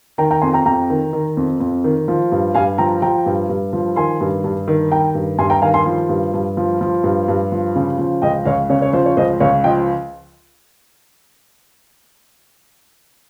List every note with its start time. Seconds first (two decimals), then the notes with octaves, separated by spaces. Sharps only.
0.18 D#3 G5 A#5
0.31 G5 A#5
0.41 F2 G#5 C6
0.53 G5 A#5
0.66 F2 G5 A#5
0.90 D#3
1.13 D#3
1.37 F2
1.60 F2
1.84 D#3
2.08 F3
2.32 G2
2.54 G2 F5 G#5
2.78 F3 G5 A#5
3.02 F3 G5 A#5
3.26 G2
3.49 G2
3.73 F3
3.96 D#3 G#5 C6
4.21 G2
4.44 G2
4.68 D#3
4.91 D#3 G5 A#5
5.15 G2
5.38 G2 G#5 C6
5.50 G5 A#5
5.62 D#3 F5 G#5
5.74 G#5 C6
5.86 F3
6.09 G2
6.34 G2
6.57 F3
6.81 F3
7.04 G2
7.28 G2
7.52 F3
7.76 C#3
7.98 F3
8.22 C#2 D#5 G5
8.45 C#2 C#5 F5
8.70 C#3 C#5
8.82 C#5
8.93 F3 C5
9.06 C#5
9.17 C#2 C5 D#5
9.40 C#2 C#5 F5
9.64 F3 D#5 G5